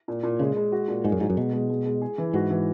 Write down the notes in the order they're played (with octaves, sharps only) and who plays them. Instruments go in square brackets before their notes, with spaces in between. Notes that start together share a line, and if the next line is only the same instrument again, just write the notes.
[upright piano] A#2
A#2
[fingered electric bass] C#3 [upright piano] G#3
[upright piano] G#3
F#4
A#2
[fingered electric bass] G#2 [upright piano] G#4
[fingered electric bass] F#2
[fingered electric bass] G#2 [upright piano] F#3
[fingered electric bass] F#2
[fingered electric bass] B2 [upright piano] G#3
[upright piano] G#3
G#3
G#3
G#4
E3
[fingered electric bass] G#2 [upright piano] F#4
[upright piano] E3